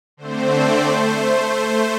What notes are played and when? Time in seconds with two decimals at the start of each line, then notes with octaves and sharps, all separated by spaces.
0.17 D3 A3 C4 C5
0.50 D5
0.81 A3 C5